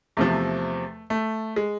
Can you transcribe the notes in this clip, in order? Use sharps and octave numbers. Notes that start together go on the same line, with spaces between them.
E2 C3 F3 A3
A3
G#3